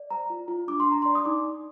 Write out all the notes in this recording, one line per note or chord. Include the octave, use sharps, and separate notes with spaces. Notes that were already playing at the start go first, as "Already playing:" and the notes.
Already playing: D5
C5 A#5
F4
F4
D4 D6
C6
D4 A#5
C6
D5
D#6
D#4 D6
D#4